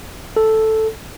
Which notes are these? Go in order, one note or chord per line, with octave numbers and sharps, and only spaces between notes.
A4